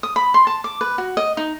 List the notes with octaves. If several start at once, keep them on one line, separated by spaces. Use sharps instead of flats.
D#6
B5
C6
A5
D6
B4
F#4
D#5
D#4